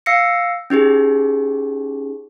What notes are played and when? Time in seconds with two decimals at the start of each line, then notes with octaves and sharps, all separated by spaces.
0.06 F5 E6 A#6 C7 C#7
0.70 C#4 D#4 G4 G#4